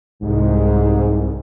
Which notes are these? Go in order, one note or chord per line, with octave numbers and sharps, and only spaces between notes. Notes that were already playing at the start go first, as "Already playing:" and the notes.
C2 G#2